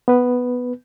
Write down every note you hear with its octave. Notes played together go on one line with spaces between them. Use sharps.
B3 B4